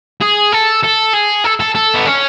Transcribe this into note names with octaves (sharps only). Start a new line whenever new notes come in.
G#4
A4
A4
G#4
A4
A4
A4
B3
C#4